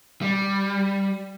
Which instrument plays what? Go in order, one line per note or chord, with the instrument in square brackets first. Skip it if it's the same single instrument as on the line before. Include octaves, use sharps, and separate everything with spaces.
[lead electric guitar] G3